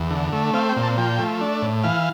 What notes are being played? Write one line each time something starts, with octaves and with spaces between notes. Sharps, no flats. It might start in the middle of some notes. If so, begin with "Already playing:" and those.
Already playing: E2
D3
A3
C4 F5
G5
A#2
A5
F3 G5
A3
D4
A2
E3 F5